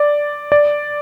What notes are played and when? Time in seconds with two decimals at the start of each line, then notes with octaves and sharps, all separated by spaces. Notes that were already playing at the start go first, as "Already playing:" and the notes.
Already playing: D5
0.52 D5